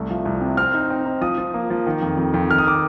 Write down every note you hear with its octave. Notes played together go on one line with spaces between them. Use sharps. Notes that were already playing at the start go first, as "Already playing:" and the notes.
Already playing: C2 A3
F3
C2
C3
C4 F6
D#4
C4
D#4
F3 D#6
F3
A#3
F3
D#3
F2
F2
F2
D#3 F6
D#6
D6